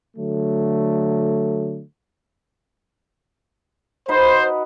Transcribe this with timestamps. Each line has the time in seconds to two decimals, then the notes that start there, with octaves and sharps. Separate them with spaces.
0.17 D3 F#3 A3
4.08 D#4 F#4 B4 C5